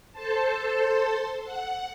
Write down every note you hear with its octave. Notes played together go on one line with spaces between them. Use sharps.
A4 C5 A5
F#5